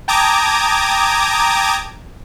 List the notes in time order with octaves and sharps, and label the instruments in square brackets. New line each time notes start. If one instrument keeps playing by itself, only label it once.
[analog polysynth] G5 A5 A#5 D6 D#6 G#6